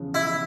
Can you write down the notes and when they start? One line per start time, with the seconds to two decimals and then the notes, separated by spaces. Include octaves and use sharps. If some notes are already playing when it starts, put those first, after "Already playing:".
Already playing: E2 C#3 F3
0.15 E4